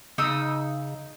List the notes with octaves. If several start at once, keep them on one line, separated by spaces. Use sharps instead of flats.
C#3 D#4 D#6 E6